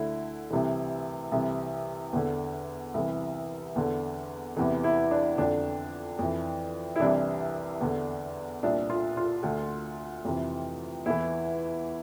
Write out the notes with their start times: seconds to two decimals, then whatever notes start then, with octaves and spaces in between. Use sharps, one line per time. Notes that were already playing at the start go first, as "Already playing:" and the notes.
Already playing: D2 D3 E4
0.50 C2 C3 E3
1.32 C2 C3 E3
2.13 E2 D3
2.94 C2 C3 E3
3.76 E2 D3
4.57 E2 C3 E3
4.84 E4
5.11 D4
5.38 F2 D3 D4
6.19 F2 E3
6.96 E4
7.00 C2 C3 E3 D4
7.81 E2 D3
8.63 C2 A#2 D4
8.90 F4
9.17 F4
9.43 D2 D3
10.25 F2 C3 E3
11.06 E2 E3 E4